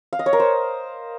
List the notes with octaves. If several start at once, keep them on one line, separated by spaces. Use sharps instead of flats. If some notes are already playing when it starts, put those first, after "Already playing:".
F5
D#5
C#5
A#4
C5